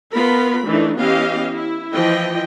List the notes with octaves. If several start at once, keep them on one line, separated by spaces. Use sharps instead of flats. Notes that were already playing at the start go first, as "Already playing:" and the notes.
B3 F4 A#4 B5
E3 A3 D4 D#4
E3 B3 C#4 G4 D#5 F5
E4
E3 F3 D#5 G5